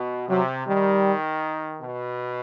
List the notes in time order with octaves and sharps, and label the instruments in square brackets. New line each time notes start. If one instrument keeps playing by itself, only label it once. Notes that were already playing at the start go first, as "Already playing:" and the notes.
Already playing: [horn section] B2
[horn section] C3 [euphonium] F#3
[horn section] D#3 [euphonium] G3
[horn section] B2